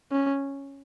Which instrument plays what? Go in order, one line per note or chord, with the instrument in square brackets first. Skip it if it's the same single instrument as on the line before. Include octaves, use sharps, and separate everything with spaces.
[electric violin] C#4